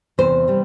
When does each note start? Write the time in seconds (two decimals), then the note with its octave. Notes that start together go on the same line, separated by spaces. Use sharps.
0.18 E2 C3 E3 C5
0.48 C3 E3 G3